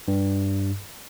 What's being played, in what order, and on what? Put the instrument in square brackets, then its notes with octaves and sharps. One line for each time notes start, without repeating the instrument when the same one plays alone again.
[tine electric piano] G2